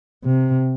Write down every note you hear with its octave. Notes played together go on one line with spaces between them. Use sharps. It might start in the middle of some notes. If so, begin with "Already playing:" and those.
C3